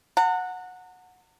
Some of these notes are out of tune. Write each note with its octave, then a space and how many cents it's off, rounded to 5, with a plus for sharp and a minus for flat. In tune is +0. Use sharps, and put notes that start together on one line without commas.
F#5 -15 A#5 -45